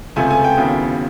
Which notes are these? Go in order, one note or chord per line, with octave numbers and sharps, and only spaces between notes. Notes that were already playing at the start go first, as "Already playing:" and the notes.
C#2 C3 F3 A3 G#5
G#5
G5
D#2 C#3 F#3 B3 E4